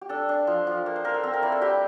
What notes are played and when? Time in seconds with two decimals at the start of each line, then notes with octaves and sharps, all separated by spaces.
0.01 G4
0.09 D4 A4
0.29 D4
0.47 F3
0.67 F3
0.86 A#3
0.96 C5
1.04 A#3 A#4
1.14 A4
1.24 C4
1.34 A#4
1.42 E4 D5
1.52 A4
1.62 G3 G4